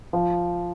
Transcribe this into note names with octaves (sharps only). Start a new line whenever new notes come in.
F3 F4